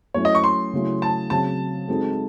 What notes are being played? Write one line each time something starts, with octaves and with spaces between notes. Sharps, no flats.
F#3 A3 C#4 E4 C#5
D#5
C#6
C6
C#3 F#3 A3 C#4 E4
A5
C#3 F#3 C4 A5
G#3 C4 D#4 F#4 A4